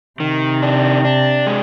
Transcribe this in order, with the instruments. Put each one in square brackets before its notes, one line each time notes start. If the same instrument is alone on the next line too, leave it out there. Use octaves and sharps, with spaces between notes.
[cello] C3 [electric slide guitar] D#3
[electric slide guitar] D4
D4
G#3